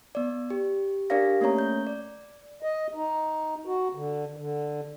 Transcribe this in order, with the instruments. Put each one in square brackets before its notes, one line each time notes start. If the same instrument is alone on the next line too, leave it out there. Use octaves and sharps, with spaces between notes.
[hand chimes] B3 D5
G4
D4 G4 A#4 D5 F5 A#6
A3 A#3 C#4 C#5 A#5
G6
D5
[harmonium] D#5
D#4
F#4
D3
D3